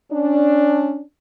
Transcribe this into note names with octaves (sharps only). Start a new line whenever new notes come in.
C#4 D4